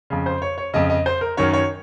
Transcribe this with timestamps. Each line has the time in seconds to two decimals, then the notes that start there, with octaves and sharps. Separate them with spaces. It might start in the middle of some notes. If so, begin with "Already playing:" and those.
0.10 F2 C#3
0.26 C5
0.42 C#5
0.58 C#5
0.73 F2 C#3 D#5
0.90 D#5
1.06 C5
1.21 A#4
1.37 F#2 D#3 C#5
1.53 C#5